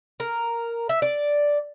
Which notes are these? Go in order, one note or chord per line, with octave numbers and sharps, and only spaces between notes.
A#4
E5
D5